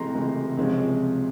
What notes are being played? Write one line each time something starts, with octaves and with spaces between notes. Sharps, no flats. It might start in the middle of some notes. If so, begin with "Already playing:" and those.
Already playing: C#2 C3 E3 A3 A#5 C6
C#2 C3 E3 A3
C#2 C3 F3 G#3 C#4